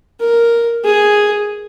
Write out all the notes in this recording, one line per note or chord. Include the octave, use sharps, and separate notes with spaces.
A#4
G#4